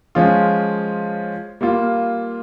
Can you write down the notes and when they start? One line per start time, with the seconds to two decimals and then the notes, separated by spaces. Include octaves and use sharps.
0.15 F3 G#3 C#4 F4
1.61 G3 A#3 F4